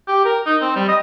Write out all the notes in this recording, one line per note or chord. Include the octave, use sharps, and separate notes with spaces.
G4
A#4
D#4
C4
G3
D#5